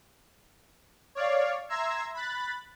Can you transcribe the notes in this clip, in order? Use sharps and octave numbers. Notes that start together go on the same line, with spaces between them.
C#5 D5 F5
E5 A#5 C6 E6 G#6
B5 F#6 A6